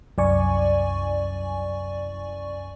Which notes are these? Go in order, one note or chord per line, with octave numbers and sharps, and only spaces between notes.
C2 F#2 D5 G#5 C#6